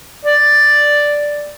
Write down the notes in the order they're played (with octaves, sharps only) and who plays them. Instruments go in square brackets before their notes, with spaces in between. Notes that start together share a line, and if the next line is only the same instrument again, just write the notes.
[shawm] D5